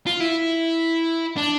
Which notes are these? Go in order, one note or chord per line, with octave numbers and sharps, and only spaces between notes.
F4
E4
D4